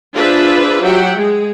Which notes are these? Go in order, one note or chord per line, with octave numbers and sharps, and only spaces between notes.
D4 F4 G#4 B4 C5 E5
F#3 G4 E5 F#5 G5
G#3 G#4